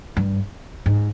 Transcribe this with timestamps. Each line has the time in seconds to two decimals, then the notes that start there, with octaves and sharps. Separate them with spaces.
0.17 G2
0.86 G#2